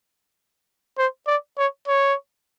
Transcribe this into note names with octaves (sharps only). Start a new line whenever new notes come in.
C5
D5
C#5
C#5